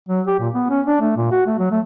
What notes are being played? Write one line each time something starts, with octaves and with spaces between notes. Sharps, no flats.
F#3
G4
A#2
B3
C#4
D4
A3
A#2
F#4
A3
F#3
A3